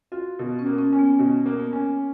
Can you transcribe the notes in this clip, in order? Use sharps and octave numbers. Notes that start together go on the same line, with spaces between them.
F4 F#4
B2
C#4
A#3
C#4
C#4
B3
B2 B3
A#3
B3
C#4